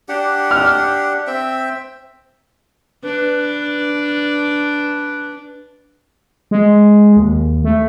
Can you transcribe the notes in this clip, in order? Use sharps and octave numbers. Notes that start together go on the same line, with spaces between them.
D4 G4 F#5
F6
C4 E5 G5
D4 B4
G#3
D#2
A3